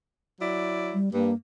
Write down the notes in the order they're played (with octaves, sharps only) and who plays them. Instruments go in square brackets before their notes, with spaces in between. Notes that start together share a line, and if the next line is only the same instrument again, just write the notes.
[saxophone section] F#3 E4 D5
[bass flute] G3
[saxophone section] G2 [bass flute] A#3